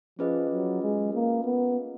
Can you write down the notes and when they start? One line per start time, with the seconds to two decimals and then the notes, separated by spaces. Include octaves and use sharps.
0.18 F3 C#4 F4 G#4 B4 D#5
0.51 F#3
0.82 G#3
1.14 A#3
1.45 B3